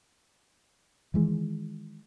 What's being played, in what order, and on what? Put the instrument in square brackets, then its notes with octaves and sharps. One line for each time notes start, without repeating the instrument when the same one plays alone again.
[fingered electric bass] D#3 E3 G#3